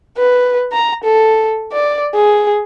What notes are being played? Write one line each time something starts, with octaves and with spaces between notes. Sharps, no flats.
B4
A#5
A4
D5
G#4